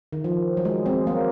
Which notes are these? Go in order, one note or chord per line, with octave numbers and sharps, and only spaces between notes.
D#3
F3
F#3
G#3
G#3 C4
F#3 A#3